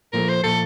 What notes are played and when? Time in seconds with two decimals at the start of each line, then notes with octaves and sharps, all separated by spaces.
0.13 A#2 F3 A3 A#4
0.29 C5
0.44 A#2 F3 A3 A4